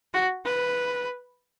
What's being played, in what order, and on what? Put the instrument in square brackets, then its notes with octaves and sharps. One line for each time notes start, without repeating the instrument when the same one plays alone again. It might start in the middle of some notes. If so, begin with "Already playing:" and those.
[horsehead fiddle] F#4
B4